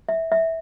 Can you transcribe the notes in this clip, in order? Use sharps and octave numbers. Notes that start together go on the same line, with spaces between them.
E5
E5